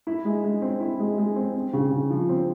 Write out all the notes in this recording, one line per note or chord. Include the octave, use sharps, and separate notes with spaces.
E4
G#3
G#3
C4
E4
G#3
G#3
C4
C4
C#3
C#3
F3
C4